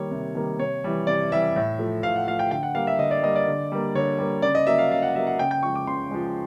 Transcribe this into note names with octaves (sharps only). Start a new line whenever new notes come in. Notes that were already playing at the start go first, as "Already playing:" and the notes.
Already playing: D#3 G3 A#3 C#5
C3
D#3 G3 A#3
C3 C#5
E3 G3
C3 D5
E3 G3 E5
A2
F3 A3
A2 F5
F#5
F3 A3 F5
G5
D3 G5
F#5
G3 A#3 F5
E5
D3 D#5
D5
G3 A#3 D#5
D5
D3
G3 A#3
D3 C#5
G3 A#3
C#3 D5
D#5
F#3 A#3 E5
F5
C#3 F5
F#5
F#3 A#3 E5
F#5
C#3 G5
G5
F3 G#3 C#6
D6
C#3 C6
F3 G#3